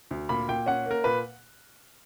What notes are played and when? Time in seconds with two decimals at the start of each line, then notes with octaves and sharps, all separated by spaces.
0.11 D2
0.29 A#2 B5
0.48 A#2 G5
0.66 C#4 F#5
0.86 A#3 A#4
1.04 A#2 B4